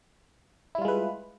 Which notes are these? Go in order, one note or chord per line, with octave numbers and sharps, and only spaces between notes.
G3 G#3 E4 F4 B4